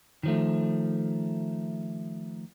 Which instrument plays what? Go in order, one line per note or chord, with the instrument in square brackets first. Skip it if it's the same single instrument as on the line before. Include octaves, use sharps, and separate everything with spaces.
[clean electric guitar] D#3 F3 A3